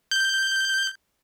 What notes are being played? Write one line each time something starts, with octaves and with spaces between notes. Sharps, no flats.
G6